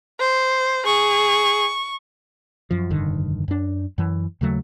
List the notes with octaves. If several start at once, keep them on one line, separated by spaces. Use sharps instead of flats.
C5
G#4 C#6
F#2 F3
F1 G2 D3 D#3
F#2 D4
F#2 E3
D#2 C#3 F#3 A3